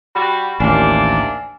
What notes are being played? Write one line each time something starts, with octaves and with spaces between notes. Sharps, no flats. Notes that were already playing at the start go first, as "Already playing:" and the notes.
G3 F#4 B5
A1 D#2 C3 A#3 D4 G#5 F6